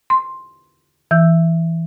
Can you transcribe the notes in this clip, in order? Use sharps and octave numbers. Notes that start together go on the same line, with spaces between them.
C6
E3 E6 G6